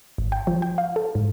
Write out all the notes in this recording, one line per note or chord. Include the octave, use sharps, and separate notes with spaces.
G#1
G5
F3
G5
F5
A4
G#2